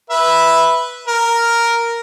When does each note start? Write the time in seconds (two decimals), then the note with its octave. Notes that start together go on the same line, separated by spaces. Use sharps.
0.10 B4 E5
1.07 A#4